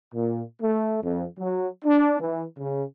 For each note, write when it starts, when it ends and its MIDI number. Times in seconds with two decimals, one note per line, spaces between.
0.13 0.42 46
0.61 1.01 57
1.02 1.25 41
1.39 1.68 54
1.84 2.16 62
2.19 2.44 52
2.58 2.83 49